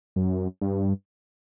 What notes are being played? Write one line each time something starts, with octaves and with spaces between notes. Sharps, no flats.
F#2
G2